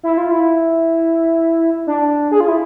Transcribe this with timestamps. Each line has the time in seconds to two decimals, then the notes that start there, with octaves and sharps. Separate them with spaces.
0.03 E4
0.18 F4
0.31 E4
1.87 D4
2.32 G#4
2.40 F4
2.48 E4